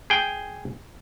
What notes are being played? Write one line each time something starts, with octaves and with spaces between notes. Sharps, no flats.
G#4 G5